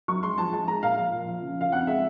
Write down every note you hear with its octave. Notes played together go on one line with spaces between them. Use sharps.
F#3 C#6
G#3 C6
F3 A5
G#3 A5
G#3 A#5
A#2 F5
F3 F5
A#2
F3
C#3
F3 F5
F2 F#5
G#3 E5